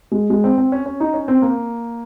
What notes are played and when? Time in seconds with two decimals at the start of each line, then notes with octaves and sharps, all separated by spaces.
0.12 G#3
0.30 G#3
0.44 C4
0.58 C4
0.72 C#4
0.86 C#4
1.00 D#4
1.13 C#4
1.28 C4
1.42 A#3